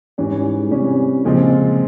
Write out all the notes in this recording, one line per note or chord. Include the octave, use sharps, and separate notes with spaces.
G#2 E3 G3 C#4
C3 E3 G3 C#4
A#2 C#3 F3 G#3 C4 F4